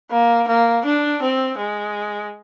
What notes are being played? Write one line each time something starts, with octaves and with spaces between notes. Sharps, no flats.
A#3
A#3
D4
C4
G#3